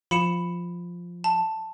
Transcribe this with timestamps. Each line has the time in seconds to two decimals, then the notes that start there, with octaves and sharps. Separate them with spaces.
0.11 F3 B5 C#7 E7
1.24 A5